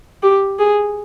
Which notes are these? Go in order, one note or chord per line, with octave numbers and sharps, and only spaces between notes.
G4
G#4